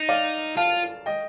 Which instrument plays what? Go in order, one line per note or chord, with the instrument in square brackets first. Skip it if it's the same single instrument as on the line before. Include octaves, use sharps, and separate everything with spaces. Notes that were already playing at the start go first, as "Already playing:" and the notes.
Already playing: [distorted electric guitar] D#4
[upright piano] D5 F5
[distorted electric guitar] F4 [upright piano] F5 A5
[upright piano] D#5 G5